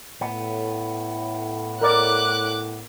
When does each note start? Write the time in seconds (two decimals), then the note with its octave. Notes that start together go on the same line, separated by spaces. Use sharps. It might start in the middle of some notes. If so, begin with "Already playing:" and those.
0.21 A2 B3
1.81 A#4 D5 D6 F#6